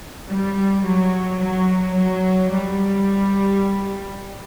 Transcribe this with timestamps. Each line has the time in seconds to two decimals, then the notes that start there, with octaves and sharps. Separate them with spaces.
0.29 G3
0.84 F#3
1.39 F#3
1.96 F#3
2.52 G3